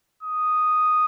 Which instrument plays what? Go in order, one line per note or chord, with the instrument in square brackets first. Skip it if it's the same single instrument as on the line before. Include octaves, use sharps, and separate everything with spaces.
[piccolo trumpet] D#6